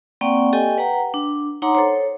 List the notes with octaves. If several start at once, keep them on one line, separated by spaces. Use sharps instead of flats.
A#3 C4 D5 F#5 G5 C#6
G4 A4 D#5 G5 G#5
B4 F#5 G5 A#5
D4
D#4 C#5 F#5 A#5 C6 D6
A4 C5 C#5